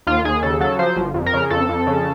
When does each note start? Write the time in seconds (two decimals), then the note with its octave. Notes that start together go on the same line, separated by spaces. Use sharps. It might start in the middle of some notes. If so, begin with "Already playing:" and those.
0.07 D#2 F4
0.24 D#2 G#4
0.43 C#3 A4
0.61 F#3 A4
0.79 F3 C5
0.96 G1
1.14 F2
1.26 A#4
1.33 C#3
1.50 F2 A4
1.69 F2
1.87 C#3